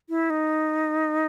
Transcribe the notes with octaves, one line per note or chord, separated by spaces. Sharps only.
E4
D#4